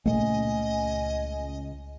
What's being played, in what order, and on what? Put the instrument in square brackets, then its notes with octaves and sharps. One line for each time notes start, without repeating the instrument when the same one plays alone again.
[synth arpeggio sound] C#2 [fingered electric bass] A#2 A3 A#3 [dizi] D#5 [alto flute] G#5